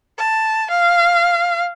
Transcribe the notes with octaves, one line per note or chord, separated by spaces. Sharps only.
A5
F5